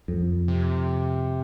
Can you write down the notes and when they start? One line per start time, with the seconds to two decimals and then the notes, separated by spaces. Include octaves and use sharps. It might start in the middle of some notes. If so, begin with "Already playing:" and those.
0.08 F2
0.48 C3